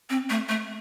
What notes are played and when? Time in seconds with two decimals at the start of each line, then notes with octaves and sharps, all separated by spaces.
0.10 C4
0.30 A3
0.49 A3